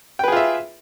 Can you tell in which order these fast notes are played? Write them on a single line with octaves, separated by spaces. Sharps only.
G5 B4 G#4 F4 E5